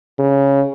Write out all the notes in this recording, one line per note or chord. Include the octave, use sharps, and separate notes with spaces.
C#3